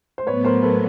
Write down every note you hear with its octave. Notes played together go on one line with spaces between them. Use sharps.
C5
A2 F#3 B3 B4 C#5
A#4 C5
A4 B4